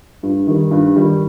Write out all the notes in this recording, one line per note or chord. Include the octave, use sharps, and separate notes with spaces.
G2
D#3 G3
G2
D#3 G3